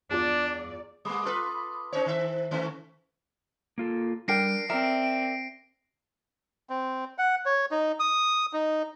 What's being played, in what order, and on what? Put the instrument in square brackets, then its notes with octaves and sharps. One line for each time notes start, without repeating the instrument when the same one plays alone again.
[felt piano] E2 F4 [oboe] D4 [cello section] D5
[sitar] G3 A#3 [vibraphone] B5 D6 D#6
[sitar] F4 A4 B4
[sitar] C#4 D#4 C#5 [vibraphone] C5
[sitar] D#3 E5
D#3 A3 C#4
[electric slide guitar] A#3 F4 A4
[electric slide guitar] G3 [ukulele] D4 A#4 G5 [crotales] A#6 C7 D7
[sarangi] C4 [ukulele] A#4 [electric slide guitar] D5 E5
[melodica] C4
F#5
C#5
D#4
D#6
D#4